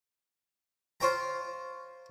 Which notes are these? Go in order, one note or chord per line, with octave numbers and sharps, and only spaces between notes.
F4 C5 C#5 G5 A#5